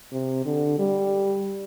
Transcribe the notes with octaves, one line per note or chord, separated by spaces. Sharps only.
C3
D3
G3